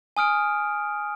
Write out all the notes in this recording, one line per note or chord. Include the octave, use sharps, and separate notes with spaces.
G#5 D#6 F6 D7